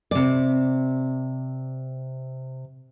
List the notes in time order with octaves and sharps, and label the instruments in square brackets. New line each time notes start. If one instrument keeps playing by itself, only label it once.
[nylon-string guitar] C3 D5